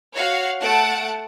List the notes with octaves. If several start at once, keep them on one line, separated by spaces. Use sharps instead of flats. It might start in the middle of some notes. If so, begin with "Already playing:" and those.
F#4 C#5 F5
A3 F#5 A5 D7